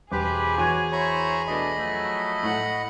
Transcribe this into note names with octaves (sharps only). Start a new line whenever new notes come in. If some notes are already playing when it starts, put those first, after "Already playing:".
E1 G4 G#4 B4 C5 D6
E2 F#4 C#5 F#5 G#5
E4 C5 C#5 A#5 B5 C#6
B2 A3 D4 D#5 B5
F3 F#3 A3
A2 F#5